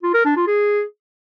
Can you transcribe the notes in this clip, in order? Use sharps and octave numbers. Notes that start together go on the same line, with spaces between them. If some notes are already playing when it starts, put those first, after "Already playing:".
F4
A#4
D4
F4
G#4